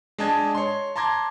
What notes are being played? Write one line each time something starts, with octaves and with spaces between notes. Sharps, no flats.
G#3 D4 D#5 A5 G#6
C#5 C6
A5 A#5 C6 D6 G#6 A#6